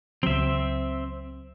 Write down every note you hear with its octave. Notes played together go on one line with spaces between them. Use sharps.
C#2 F#3 C4 E5